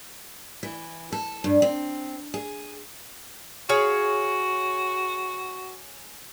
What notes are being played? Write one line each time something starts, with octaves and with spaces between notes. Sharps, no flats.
E3
A4
G2
C4
G#4
F#4 G#4 C#5 F5